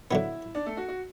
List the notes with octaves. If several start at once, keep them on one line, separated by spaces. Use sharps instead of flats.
D3 F#3 B3 E4 E5
D4 D5
A3 A4
F#4
F#4